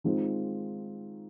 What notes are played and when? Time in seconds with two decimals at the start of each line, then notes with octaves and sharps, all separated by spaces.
0.04 D#3 G#3 C4 F4